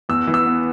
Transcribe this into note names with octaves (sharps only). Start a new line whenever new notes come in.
E2 E6
E3
E6
B3